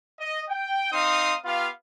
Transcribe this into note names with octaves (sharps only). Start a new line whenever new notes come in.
D#5
G5
C4 D#4 D#5 F5 C6 D#6
B3 F4 G4 F5